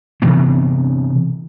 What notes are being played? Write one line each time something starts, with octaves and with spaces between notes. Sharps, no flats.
C3 E3 B3 C4